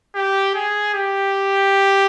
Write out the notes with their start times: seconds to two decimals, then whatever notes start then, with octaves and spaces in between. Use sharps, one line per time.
0.15 G4
0.54 G#4
0.94 G4